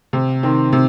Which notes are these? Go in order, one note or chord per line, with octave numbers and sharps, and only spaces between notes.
C3
D#3 C4
C3